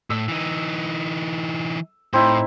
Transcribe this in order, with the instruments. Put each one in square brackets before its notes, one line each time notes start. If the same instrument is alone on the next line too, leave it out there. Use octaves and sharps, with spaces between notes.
[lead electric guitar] A2 [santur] E6
[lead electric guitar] E3 D#4
[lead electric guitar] A2 [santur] C4 D#4 E4